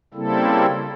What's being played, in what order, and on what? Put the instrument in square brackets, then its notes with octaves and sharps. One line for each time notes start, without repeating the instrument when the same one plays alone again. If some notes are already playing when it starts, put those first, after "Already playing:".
[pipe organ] C#3 G3 A#3 C4 E4 A4